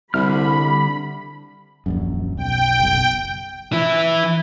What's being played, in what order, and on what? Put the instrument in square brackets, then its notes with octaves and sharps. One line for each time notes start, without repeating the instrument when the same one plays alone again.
[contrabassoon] C2 [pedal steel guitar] D3 G3 F6 [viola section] B5
[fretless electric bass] D#1 A#1 F#2
[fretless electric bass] B1 [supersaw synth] G5
[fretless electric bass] F#1 B1
[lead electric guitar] E3 E4